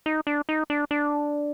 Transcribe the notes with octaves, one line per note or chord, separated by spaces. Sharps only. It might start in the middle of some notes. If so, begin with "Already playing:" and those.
D#4
D4
D#4
D4
D4